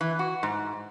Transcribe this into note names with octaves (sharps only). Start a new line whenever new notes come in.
E3
F#4
G#2